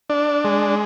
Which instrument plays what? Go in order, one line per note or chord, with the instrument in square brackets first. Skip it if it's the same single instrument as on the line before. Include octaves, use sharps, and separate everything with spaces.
[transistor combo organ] D4
G#3